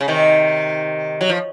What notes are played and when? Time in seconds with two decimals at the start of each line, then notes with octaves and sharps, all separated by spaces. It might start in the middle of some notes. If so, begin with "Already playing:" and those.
0.01 C#3
0.08 C3 D#3
1.21 F#3
1.29 F3